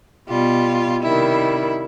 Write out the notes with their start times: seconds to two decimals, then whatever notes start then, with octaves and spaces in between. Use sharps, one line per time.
0.28 B2 G3 F4
1.03 C3 D#3 G3 E4